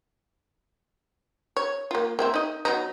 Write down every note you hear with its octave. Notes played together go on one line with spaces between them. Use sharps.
C#5
A#3 F4
A#3 C4 E5
D#4 D#5
F#3 B3 D#4